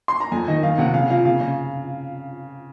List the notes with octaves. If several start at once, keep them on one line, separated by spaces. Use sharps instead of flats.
C6
A#5
F2 G#5
D#3 D#5
D#3 F5
C3 F#5
C#3 F5
F3 F5
C#3 F5
C#3